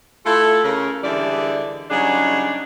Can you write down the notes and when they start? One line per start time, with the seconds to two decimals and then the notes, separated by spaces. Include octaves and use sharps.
0.25 A3 E4 F4 A4
0.63 C#3 A#4
1.03 D3 E3 G3 G#3 D5 E5
1.89 C#3 F#3 G3 D4 D#4 G#4